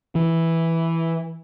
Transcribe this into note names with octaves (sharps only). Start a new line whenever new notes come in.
E3